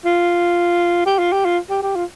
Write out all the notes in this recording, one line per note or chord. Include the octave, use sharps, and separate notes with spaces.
F4
G4
F4
G4
F4
G4
G4
F4